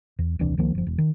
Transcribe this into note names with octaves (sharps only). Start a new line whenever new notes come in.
E2
D#1 C2 E3 D4
C#2 D#3 F3 A#3
F#1 F3
E1
D#3